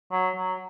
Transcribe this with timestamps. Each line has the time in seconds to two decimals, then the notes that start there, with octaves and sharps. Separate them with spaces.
0.12 F#3
0.36 F#3